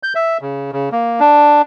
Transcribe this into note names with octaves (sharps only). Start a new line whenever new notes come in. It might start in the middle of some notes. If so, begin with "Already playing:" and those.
G6
E5
C#3
C#3
A#3
D4